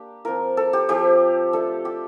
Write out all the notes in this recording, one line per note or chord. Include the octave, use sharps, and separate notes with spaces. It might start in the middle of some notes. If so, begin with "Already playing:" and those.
Already playing: A#3 D4 G4
F3 C4 F4 A#4
A4
G4
F3 C4 F4 G4
A3 D4 F4 A4
G4